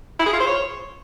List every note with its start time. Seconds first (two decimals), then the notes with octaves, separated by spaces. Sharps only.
0.19 E4
0.26 G#4
0.33 F4
0.40 C5
0.47 C#5